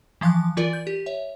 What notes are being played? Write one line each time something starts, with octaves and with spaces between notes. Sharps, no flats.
E3 F3 F5 C6 F#6
E3 F4 A#4 D5
G6
G4
C#5 E5